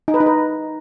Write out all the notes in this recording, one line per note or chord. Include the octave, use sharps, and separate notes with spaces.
D#4
B4
D#4
B4